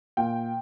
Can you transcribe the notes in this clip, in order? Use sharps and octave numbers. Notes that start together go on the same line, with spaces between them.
A#2 G5